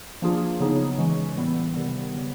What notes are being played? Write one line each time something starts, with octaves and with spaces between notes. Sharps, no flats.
F3 A#3 D4 F4 G#4
C#3 F#3 B3 D#4 G#4
C#3 E3 G#3 C#4 F#4
A2 E3 G3 B3 E4
C3 D#3 G3 B3
C#3 F#3 B3